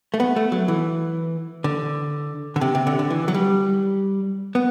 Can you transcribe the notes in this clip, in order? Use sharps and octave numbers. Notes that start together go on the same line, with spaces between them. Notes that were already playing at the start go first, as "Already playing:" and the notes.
A3
B3
A3
F#3
E3
D3
D3
C3
C3
D3
D3
E3
F#3
G3
B3